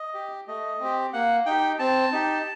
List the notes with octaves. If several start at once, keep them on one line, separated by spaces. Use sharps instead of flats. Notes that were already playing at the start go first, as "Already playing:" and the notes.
Already playing: D#5
G4
A3 D#5
C4 G4
A#3 F#5
D#4 G4 G5
C4 A5
D#4 G4